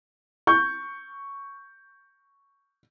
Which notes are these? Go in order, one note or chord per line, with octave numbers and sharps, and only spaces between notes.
C#6 G6